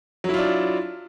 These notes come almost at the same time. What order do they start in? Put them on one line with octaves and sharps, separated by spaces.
F#3 E4 F4 D4